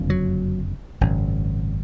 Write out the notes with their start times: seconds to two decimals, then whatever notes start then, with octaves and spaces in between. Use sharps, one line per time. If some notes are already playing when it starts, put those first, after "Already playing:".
Already playing: F#1 F2 D3
0.10 F#3
1.01 G#1 F#2 C#3